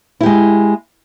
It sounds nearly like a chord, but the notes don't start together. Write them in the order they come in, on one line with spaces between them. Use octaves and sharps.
E4 G4 G#3